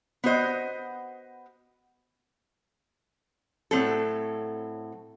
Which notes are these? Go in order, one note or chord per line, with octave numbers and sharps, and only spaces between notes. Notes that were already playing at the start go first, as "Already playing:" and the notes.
B3 F#4 C5 D#5
A2 F#3 C4 A4